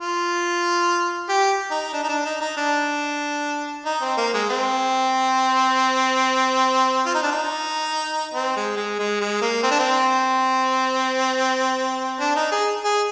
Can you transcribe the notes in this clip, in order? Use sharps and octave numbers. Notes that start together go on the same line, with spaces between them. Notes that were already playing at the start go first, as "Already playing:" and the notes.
F4
G4
D#4
D4
D#4
D4
D#4
D#4
D4
D#4
C4
A#3
G#3
C4
F4
D#4
D4
D#4
C4
G#3
G#3
G#3
G#3
A#3
C4
D4
C4
D4
D#4
G#4
G#4